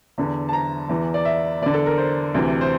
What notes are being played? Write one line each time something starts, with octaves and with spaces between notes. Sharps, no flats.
E2 D3
A5
A#5
E2 E3
D5
E5
E2 D3 D5
A4
A#4
C5
D2 C3 E3
C5